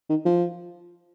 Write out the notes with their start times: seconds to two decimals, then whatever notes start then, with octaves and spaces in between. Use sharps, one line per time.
0.09 D#3
0.25 F3